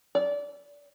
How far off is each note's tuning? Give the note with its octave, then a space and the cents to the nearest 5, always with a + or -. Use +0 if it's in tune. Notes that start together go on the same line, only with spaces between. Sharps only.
D5 -25